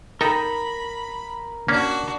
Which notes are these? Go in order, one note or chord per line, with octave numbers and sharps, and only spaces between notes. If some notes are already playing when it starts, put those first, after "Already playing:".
D#4 A4 A#4 G5 A#5 B5
A#3 C#4 D4 F#4